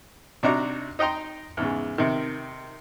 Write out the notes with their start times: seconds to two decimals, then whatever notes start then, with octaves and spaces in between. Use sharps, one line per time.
0.43 C3 D4 D#4 F#4 A#5 D6
0.99 D#4 D#5 G5 A#5 C6
1.57 E2 G#2 C#3
1.98 C3 D#3